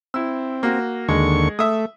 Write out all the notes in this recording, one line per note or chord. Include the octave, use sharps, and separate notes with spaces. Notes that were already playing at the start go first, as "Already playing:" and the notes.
C4 E4 E6
A#3 F#4
D#2 D3 G#3 C#6
A3 E5 D#6